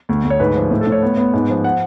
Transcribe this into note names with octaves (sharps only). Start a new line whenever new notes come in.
D2
D2
C#5
G#2 B4
F3
A2
A4
A2 C#5
B3
B3
G#2
F3
F#5